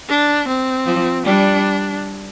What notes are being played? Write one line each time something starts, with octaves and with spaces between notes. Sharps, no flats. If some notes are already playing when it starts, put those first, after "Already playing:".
D4
C4
F3
G3 D4